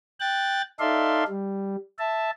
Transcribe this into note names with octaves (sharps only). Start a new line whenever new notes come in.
G5 F#6 A6
D#4 A4 D5 E5 F5 C6
G3
E5 A5